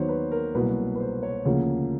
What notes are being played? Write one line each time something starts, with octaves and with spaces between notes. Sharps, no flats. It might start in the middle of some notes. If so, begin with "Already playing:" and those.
Already playing: D#2 D#3 F#3 B3 C5 C#5
B4
A#4
C2 B2 F#3 A#3 B4
B4
C5
C#5
D2 C#3 F3 A#3